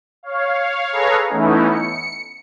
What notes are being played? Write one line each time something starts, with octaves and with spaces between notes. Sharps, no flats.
C#5 F5
G#4 A4 B4 C#5 F5 A#5
E3 A3 B3 C#4 D#4 E4
C#7